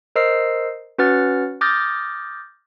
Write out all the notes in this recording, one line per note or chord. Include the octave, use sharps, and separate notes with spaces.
A#4 C5 D#5 E6 C7
C#4 F#4 B4 F#5 F6 A6
D6 D#6 F6 G6 A6 A#6